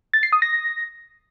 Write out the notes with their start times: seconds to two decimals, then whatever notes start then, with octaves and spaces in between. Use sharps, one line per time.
0.14 A6
0.23 C7
0.33 D#6
0.42 A#6